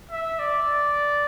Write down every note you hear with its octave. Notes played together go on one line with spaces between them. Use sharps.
E5
D5